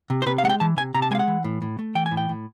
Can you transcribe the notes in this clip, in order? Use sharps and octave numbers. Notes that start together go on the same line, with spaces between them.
C3
C5
C3 B4
F5
G#3 F#5
G5
E3 A5
C3 G#5
C3 A#5
A5
G#3 F5 G#5
F#5
E3
A2
A2
A3
E3 G5
G#5
A2
G5
A2